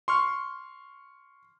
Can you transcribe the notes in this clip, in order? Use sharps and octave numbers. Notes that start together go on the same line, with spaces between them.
C6 C#6 F6